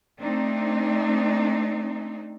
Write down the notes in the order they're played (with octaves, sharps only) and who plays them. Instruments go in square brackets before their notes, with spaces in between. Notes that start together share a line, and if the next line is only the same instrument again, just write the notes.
[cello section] A3 C4 D4 D#4